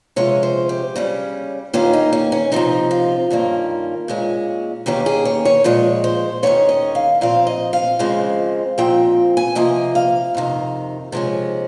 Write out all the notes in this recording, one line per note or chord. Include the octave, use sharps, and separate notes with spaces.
C3 F3 G#3 C#4 C#5
C5
G4
C#3 G3 C#4
D#2 D#3 A#3 C#4 F4
D#4
C#4
C#4
C3 F3 C4 D#4
F4
G2 D#3 A#3 C#4
A#2 G#3 C#4
D#2 D#3 A#3 C#4 G4
G#4
C#5
C#5
A#2 F3 G#3 C#5
C5
D#2 D#3 G#3 C#4 C#5
D#5
F5
A#2 F3 C4 F5
D#5
F5
F2 C#3 F3 G#3 C4
A#2 F3 C4 G5
G#5
C3 F3 A#3 D#5
F5
F2 C3 D#3
C3 F3 G#3 C#4